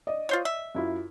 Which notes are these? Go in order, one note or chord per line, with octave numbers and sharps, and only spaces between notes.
D5 D#5
F4 C5 C#5
E5
F#2 E4 F4